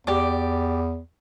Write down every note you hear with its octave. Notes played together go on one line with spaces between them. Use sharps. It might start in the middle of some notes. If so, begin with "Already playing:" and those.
E2 G4 D5 D6